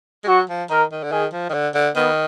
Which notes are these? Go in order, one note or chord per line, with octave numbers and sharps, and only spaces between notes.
G#3
F#3 F#4
F3
D#3 A#4
D#3
D3
D#3 G#4
F3
D#3
D3
D3
D#3 B3